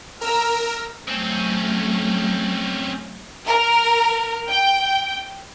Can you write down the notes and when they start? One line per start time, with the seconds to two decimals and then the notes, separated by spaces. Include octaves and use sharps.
0.21 A#4 A#5 E6 F6
1.08 F#3 A3 C4 C#4
3.48 A#4
4.49 G5